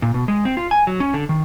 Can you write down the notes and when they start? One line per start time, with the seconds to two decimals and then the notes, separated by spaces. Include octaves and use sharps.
0.02 A#2
0.14 B2
0.28 G#3
0.45 C4
0.57 F4
0.71 G#5
0.87 F#3
1.00 C#4
1.14 D3
1.29 D#3